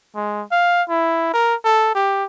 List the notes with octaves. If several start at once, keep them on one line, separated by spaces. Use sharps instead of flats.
G#3
F5
E4
A#4
A4
G4